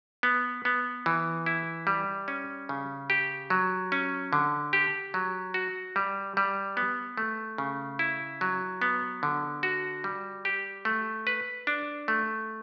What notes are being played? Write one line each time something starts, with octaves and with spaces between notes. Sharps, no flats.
B3
B3
E3
E4
G3
C#4
C#3
G4
F#3
C#4
D3
G4
F#3
F#4
G3
G3
B3
A3
C#3
E4
F#3
B3
D3
F#4
G3
G4
A3
B4
D4
A3